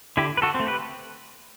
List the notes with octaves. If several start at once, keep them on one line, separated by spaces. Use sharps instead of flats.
D3 E4 G4
B4
F#4 A4
C4
A3
G4 B4